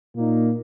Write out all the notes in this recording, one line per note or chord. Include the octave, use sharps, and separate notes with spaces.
A#2 A#3 D#4